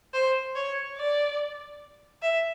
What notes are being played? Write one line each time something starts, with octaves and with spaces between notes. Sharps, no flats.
C5
C#5
D5
E5